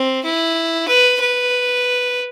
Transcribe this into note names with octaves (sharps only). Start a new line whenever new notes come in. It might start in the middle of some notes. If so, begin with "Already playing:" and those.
Already playing: C4
E4
B4
B4